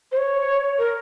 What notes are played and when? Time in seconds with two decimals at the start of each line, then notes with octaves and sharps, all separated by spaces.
0.12 C5
0.17 C#5
0.78 A#4